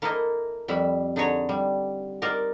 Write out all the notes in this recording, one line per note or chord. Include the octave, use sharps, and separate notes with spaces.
A#3 E4 A4 A#4 C5 D#5
F2 G3 E5 B5
D3 D#4 G#4 B4 C#5 A#5
G3
D#4 A#4 C5 D5 D#5